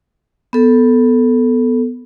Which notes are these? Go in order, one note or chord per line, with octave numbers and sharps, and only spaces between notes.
B3 A4